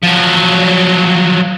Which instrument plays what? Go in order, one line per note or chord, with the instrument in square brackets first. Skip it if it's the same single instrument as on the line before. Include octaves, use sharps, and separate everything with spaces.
[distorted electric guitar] F3 F#3